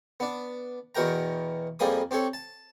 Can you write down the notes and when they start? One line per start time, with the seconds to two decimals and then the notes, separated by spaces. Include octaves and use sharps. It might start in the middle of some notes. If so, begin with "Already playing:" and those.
0.20 B3 D4
0.95 E2 B2 F#4 A#4 G5 A#5
1.79 F2 G3 A#3 G#4 B5 D#6
2.11 C4 G4 A4 C#5
2.33 A5